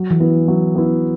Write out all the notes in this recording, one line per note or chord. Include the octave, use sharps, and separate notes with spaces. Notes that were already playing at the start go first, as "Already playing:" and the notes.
Already playing: F#3
E3
B3 E4
F#3
B3 E4